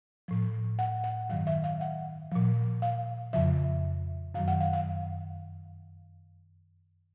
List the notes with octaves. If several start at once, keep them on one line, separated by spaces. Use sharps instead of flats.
A2 F3
F#5
F#5
G2 D#3 F#3 F5
E5
F5
F#5
A#2 F3
F5
F2 C#3 F3 E5
F#2 D#3 F#3 F5
F#5
F5
F5